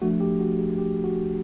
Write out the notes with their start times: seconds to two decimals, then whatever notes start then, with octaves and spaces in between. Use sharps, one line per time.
0.02 F3 A3 D4 F#4
0.20 G4
0.40 F#4
0.59 G#4
0.78 G4
1.04 F#4